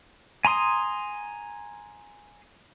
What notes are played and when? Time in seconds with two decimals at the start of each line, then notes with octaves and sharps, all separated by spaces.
0.45 G#5 A#5 C6 D#6